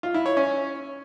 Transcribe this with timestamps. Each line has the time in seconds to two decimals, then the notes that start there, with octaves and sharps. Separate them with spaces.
0.03 F4
0.14 E4
0.26 C#5
0.37 C#4